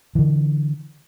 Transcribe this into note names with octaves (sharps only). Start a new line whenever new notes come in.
D3 E3